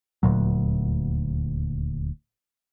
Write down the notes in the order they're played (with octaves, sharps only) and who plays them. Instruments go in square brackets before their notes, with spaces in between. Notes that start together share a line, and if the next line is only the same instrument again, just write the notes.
[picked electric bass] D#1 D2 A#2 F#3